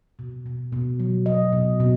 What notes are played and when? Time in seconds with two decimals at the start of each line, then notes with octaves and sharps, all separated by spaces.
0.19 B2
0.46 B2
0.73 B2
0.99 F#3
1.26 F#3 D#5
1.53 B2
1.80 B2